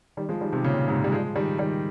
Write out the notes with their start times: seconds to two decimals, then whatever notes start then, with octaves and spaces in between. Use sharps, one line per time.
0.17 D#3 G3
0.29 F3 G#3
0.41 D#3 G3
0.53 C3 D#3
0.64 A#2 C#3
0.88 G#2 C3
1.04 G3
1.12 F3 G#3
1.36 D#3 G3
1.59 D#3 G3